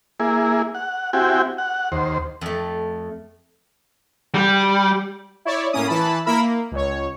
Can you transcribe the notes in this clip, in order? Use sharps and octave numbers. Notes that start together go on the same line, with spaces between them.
A#3 E4 G#4
F#5
C4 E4 F#4 G4 G5 G#5
F#5
D#2 C5
F2 A3
G3
E4 C#5 D5
A2 A#3 C#4 D#6
E3 A5 B5
A#3 E4 A#4 B5 E6
A#3
C#2 C#5